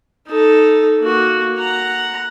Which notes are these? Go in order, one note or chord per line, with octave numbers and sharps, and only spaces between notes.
D#4 A4
A#3 F#4
F#5 A#5